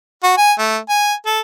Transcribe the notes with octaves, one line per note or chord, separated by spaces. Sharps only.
F#4
G#5
A3
G#5
A4